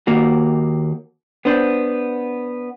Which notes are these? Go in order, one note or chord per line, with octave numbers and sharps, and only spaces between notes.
D#2 A#3 F#4
B3 D4 C5